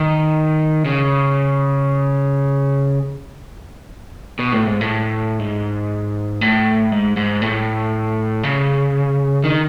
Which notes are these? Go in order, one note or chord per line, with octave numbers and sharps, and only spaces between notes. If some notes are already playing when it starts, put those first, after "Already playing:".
Already playing: D#3
C#3
B2
A2
G#2
A2
G#2
A2
G#2
G#2
A2
C#3
D#3